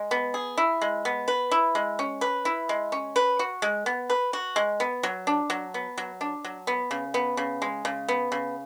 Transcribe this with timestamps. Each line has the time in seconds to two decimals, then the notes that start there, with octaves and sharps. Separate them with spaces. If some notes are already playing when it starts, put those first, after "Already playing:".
Already playing: G#3
0.11 B3
0.34 G#4
0.57 E4
0.82 G#3
1.05 B3
1.28 B4
1.51 E4
1.75 G#3
1.99 C#4
2.21 B4
2.45 E4
2.69 G#3
2.92 C#4
3.16 B4
3.39 F#4
3.62 G#3
3.86 B3
4.10 B4
4.33 F#4
4.56 G#3
4.80 B3
5.03 F#3
5.27 D4
5.50 F#3
5.74 B3
5.98 F#3
6.21 D4
6.44 F#3
6.67 B3
6.91 C#3
7.14 B3
7.37 C#3
7.62 G#3
7.85 C#3
8.08 B3
8.32 C#3